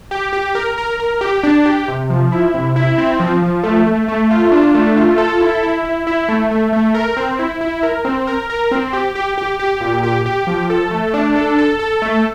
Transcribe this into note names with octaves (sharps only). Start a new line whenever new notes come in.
G4
G4
A#4
A#4
A#4
G4
D4
G4
C3
F3
E4
C3
E4
C4
F3
F3
A3
A3
A3
F4
D4
A3
F4
A4
E4
E4
E4
E4
A3
A3
A3
A#4
C4
E4
E4
A#4
C4
A#4
A#4
C4
G4
G4
G4
G4
A#2
G4
G4
F3
A4
A3
D4
A4
A4
A4
A3